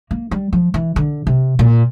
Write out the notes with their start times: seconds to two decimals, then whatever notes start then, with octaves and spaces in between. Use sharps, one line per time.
0.11 A#3
0.31 G3
0.53 F3
0.74 E3
0.96 D3
1.27 C3
1.59 A#2